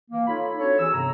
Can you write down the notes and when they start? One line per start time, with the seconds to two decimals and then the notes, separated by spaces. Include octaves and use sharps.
0.11 E3 A#3
0.27 D#4 F4 A4 C#5 B5
0.59 C4 D4 F#4 A4 C#5
0.78 E3 G#4 A4 C#5 E6
0.93 G2 C3 B3 A#5